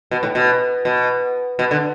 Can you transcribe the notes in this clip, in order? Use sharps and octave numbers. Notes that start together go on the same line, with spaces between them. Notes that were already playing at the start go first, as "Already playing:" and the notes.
B2
A2
B2
B2
B2
D3